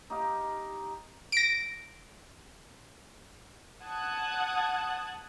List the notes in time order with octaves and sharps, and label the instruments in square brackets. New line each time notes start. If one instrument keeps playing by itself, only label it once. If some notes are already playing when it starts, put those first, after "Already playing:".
[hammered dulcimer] D#4 G4 F5
[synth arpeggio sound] A#6 D7
[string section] F#5 A5 D#6 F#6 G#6